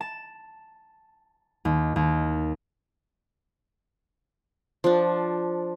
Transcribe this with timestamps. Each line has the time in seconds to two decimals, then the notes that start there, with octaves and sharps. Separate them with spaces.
0.01 A5
1.65 D#2
1.96 D#2
4.84 F3 D4